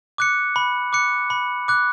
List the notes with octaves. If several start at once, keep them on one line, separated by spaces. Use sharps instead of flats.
D6 F#6 C#7
B5
D6 F#6 C#7
B5
D6 F#6